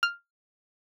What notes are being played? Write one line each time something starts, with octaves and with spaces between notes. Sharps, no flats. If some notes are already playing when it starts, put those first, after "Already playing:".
F6